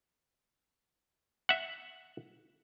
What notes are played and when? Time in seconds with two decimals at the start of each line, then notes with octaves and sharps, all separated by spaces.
1.49 E5 F#5